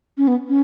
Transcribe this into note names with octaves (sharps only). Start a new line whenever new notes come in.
C#4
B3
C#4